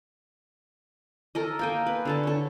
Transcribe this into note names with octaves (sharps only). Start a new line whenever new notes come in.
A4 A#4 D#5
A#3 G5 G#5
B4
D3 A4 A5
A4 C#5